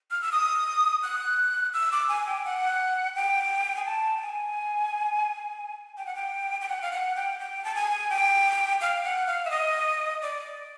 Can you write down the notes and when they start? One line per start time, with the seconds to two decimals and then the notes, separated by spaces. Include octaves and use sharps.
0.11 F6
0.22 E6
0.32 D#6
1.03 F#6
1.74 E6
1.92 D6
2.09 G#5
2.27 G5
2.45 F#5
3.15 G5
3.76 G#5
3.85 A5
4.17 G5
4.21 G#5
5.97 G5
6.06 F#5
6.15 G5
6.61 G5
6.69 F#5
6.82 F5
6.92 F#5
7.16 G5
7.40 G5
7.65 A5
7.75 G#5
8.10 G5
8.81 F5
9.04 F#5
9.27 F5
9.45 E5
9.51 D#5
10.22 D5